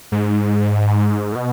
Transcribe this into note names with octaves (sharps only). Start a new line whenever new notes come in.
G#2
A2
B2